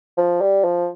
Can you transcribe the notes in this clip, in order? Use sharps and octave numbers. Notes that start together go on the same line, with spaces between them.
F3
G3
F3